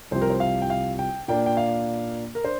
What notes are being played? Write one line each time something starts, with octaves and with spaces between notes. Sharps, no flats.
C2 C3 F3 C4 C5
A#4
C5
F5
G5
F5
G5
A#2 A#3 D4 G5
G5
F5
A#4
D4 C5